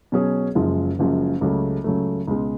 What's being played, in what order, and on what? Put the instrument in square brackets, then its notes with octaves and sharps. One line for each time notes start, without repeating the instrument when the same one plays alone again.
[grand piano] B2 F#3 C#4 G#4
F#1 F#2 F3 G#3
F#1 F#2 F3 G#3
C#2 C#3 F#3 A3
C#2 C#3 F#3 A3
C#2 B2 G#3